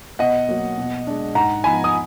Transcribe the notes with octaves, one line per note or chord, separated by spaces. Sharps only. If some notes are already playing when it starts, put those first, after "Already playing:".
B2 D#5 F#5
F#3 A#3
B2
G#3 D4
G#2 F#5 A#5
F3 B3 D#4 G#5 B5
D#6